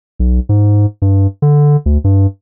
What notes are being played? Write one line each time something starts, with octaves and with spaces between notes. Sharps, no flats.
B1
G#2
G2
D3
D2
G2